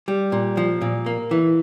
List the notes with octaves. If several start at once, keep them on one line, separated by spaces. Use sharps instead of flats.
G3
A#2
F3
A#2
A#3
E3